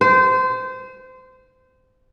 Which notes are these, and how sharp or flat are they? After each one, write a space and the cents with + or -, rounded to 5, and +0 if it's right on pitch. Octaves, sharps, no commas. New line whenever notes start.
C5 -25